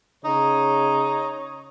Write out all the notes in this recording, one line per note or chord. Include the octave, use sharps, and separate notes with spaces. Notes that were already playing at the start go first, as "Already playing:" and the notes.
C#3 D#4 C#5